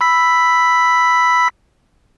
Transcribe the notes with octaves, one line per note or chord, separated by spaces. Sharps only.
B5 E6 B6